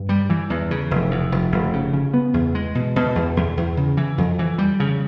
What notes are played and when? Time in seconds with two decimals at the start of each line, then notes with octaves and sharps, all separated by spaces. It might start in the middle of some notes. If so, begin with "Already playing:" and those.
Already playing: G2
0.09 G3
0.30 E3
0.50 E2
0.71 C#3
0.91 F1
1.11 E2
1.32 F1
1.52 F1
1.73 C#3
1.93 C#3
2.14 B3
2.34 E2
2.55 G#3
2.75 B2
2.96 B2
3.15 E2
3.37 E2
3.57 E2
3.77 C#3
3.97 E3
4.18 F2
4.39 E3
4.58 G3
4.80 C#3